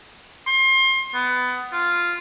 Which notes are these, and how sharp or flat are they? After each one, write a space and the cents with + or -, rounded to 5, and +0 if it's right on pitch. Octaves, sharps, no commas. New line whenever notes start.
C6 +30
B3 +20
F4 -5